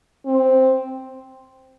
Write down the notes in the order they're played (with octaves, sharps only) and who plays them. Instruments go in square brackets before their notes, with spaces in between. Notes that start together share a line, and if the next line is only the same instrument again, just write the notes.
[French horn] C4